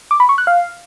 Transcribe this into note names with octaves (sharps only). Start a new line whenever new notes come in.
D6
B5
C#6
F#6
F5